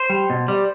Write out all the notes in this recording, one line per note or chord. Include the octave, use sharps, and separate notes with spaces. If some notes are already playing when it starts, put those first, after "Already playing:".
Already playing: C5
G3
B2
G3